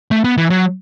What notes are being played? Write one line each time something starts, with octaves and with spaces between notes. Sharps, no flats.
A3
B3
E3
F#3